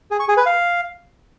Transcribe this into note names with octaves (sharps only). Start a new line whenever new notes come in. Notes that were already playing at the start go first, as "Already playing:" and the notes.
G#4
C#6
G#4
B4
F5